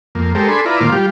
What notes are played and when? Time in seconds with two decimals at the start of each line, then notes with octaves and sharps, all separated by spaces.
0.15 F2 A#3
0.35 G#3 G4 A4 A#4 C5
0.48 D4 G#4 A4 B5 C6
0.66 E4 F4 B4 D5 A#5
0.81 A#2 D#3 A#3 F4 C5 D6
0.92 G3 F4 G4